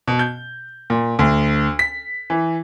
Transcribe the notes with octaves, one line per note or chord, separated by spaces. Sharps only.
B2
G6
A#2
D2
B6
E3